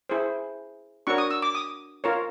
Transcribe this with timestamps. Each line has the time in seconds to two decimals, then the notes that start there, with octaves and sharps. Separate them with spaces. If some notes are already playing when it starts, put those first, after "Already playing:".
0.09 E4 G#4 C5
1.07 D4 F#4 A#4 C#5 C#6
1.18 D#6
1.31 E6
1.42 D6
1.55 D#6
2.04 F4 A#4 C#5